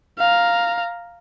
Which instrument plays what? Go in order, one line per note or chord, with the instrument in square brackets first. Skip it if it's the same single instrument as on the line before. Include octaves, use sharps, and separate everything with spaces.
[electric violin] F5 A#5